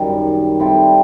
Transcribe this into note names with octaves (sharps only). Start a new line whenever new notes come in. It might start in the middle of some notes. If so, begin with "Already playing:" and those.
Already playing: F#2 D#3 G3
G3 C4 E4 A4